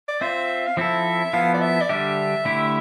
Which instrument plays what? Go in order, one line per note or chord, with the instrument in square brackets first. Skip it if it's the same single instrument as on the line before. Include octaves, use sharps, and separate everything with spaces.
[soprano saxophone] D5
[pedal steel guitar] C4 F4 C5 [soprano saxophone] E5
[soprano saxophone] F5
[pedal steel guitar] F3 C4 E4 A4 [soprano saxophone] E5
[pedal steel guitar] F3 B3 E4 A4 [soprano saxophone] F5
[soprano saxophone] D5
E5
D5
[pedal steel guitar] D3 G3 D4 G4 [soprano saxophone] E5
[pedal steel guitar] D3 A3 E4 G4